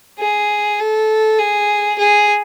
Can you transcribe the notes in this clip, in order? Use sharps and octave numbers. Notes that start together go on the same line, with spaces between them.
G#4
A4
G#4
G#4